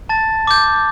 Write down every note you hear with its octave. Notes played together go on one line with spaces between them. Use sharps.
A5 A6
D6 G6